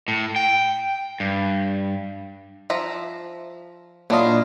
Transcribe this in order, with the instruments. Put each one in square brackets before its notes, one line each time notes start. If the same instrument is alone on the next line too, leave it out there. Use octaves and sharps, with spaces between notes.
[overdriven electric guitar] A2
G5
G2
[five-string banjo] F3 E5 A#5
[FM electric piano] A#2 D4 D#5 [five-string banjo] F#3 E4 [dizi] F4